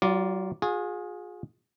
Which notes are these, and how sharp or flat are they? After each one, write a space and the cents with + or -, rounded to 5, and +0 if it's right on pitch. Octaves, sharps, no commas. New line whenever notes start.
F#3 +35 F4 +0 D5 -5
F4 +45 G#4 +0